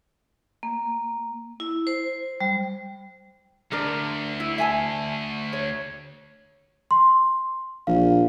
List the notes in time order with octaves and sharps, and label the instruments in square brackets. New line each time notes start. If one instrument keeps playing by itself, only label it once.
[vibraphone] A#3
E4
C5
G3
[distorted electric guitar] D2 [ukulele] D4 A#4
[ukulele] E4
E5 G#5 A5
C#5
[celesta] C6
[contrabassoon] A#1 [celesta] F5